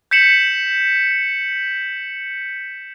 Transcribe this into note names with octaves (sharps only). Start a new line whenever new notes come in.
G6 B6 C#7 E7 F#7